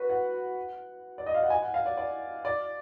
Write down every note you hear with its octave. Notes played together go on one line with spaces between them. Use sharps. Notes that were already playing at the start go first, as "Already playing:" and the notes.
Already playing: F#4 B4
F#5
D5
D#5
F5
F#5
G#5
F#5
F5
D5
D5
D5